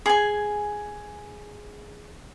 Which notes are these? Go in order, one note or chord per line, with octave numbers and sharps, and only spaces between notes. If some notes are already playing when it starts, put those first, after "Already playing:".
G#4 G#5